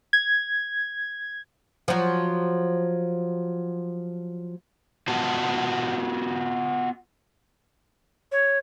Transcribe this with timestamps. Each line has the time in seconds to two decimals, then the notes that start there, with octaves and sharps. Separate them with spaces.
0.13 G#6
1.88 F3 F#3
5.08 B3 F4 F#4 D#5 A5
8.32 C#5